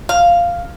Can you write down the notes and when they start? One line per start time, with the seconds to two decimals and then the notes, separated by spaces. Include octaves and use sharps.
0.09 F5